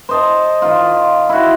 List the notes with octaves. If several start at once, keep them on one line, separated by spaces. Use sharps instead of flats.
C5 D#5 A5
D#3 F4
E4 F#4